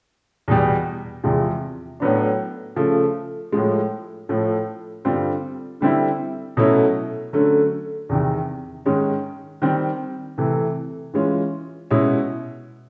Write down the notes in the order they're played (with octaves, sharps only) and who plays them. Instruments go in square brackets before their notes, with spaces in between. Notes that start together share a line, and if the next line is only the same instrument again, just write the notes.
[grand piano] E2 B2 G3
E2 C3 F3 G#3
A2 F#3 B3 D4
C#3 F3 A3
A2 F3 G#3
A2 F3 A3
G2 D3 G3 C4 F4
D3 G3 C4 E4
B2 F#3 A3 C#4 E4
D3 F#3 A3 C#4
E2 C3 D#3
G#2 D#3 G#3 C#4
D#3 G3 C4
C3 E3 A3
E3 G#3 C#4 F4
B2 G#3 C#4 E4